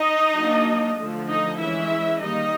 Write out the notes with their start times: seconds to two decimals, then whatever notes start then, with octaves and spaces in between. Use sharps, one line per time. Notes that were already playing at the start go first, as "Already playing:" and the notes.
Already playing: D#4 D#5
0.36 F#3 A#3 D4
0.97 D3 F3 A3
1.28 D#4 D#5
1.59 E3 G#3 C#4 E4 E5
2.20 D#3 G3 A#3 D#4 D#5